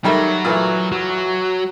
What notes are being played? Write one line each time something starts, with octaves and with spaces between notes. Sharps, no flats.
D#3 F#3 G3 A3
A#2 E3 A3
F#3